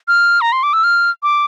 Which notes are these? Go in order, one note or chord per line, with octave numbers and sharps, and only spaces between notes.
F6
A#5
C6
D6
E6
F6
D6